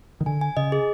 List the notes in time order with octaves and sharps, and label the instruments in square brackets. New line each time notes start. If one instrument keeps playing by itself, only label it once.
[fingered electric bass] D#3
[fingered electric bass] D3 [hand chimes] G#5
[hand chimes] G#5
[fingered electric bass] C#3 [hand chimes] D#5
[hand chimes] G#4